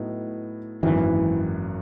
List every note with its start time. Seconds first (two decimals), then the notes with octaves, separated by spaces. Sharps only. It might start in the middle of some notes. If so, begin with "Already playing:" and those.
Already playing: A2 F#3 B3 D#4
0.83 G#1 F#2 D#3 E3 F#3 A#3